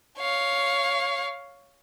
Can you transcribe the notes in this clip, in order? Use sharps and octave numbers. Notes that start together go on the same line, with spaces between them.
C#5 F5